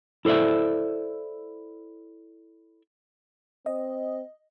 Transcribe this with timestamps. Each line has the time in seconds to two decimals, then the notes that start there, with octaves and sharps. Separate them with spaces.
0.25 E4 A4 C5 D5 E5
3.66 C4 D#5